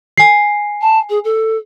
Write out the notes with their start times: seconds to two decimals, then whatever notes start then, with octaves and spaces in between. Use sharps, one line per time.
0.18 G#5 C7
0.81 A5
1.10 G#4
1.24 A4